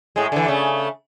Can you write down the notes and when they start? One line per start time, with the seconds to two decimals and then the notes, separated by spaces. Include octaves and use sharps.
0.16 A2 G#3
0.32 D3 E3
0.47 C#3 A3